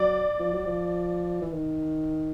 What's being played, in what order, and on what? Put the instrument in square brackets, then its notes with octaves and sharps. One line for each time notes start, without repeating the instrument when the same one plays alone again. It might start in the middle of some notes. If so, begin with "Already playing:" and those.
Already playing: [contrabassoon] F#3 [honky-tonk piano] D5
[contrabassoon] F3
F#3
F3
E3
D#3